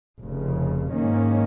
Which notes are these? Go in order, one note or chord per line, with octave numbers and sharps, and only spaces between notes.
F1 F2 C#3
G#2 D#3 A#3 C#4